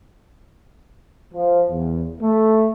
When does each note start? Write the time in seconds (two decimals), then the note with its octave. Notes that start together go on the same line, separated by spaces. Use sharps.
1.33 F3
1.69 E2
2.21 A3